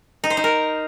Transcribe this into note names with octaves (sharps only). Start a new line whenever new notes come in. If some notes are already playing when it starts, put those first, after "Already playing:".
D#4
C5
D#4
A#4